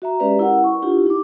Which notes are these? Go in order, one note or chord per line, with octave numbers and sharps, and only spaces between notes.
F#4 E5 A#5
G#3 C#4 G4 B4 D5 E5
E4 A#4 F#5
C#6
D4 E4 F4 G4
D#4 D6